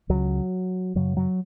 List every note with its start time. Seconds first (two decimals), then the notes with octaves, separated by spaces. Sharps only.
0.09 C#2 C#3 F#3
0.95 F#2 C#3 F#3
1.17 F#3